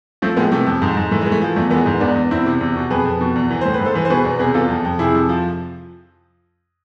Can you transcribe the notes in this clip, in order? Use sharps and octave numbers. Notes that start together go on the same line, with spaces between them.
F3 A3 C4
A2 G#3 B3
C3 A3
F2
G#2
G#2
E3 A3
G#3
E3
A3
F3
E2 A3
E3 G#3 B3
G#2
E2 B3 D4
E2
E2 C4 E4
C3
E2
B2
F2 G#4 B4
F2
B2
E2
E3
A2 C5
B4
G#2
A4 C5
E3
C5
B2 G#4 B4
E2
C3 G#4 B4
E2 F4 A4
F2
F2
C3 E4 G#4
F2
F3